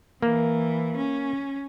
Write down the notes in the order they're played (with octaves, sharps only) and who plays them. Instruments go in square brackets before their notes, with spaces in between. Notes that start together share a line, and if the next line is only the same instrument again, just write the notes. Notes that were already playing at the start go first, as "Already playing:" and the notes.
[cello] E3 [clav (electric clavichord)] A#3
[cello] C#4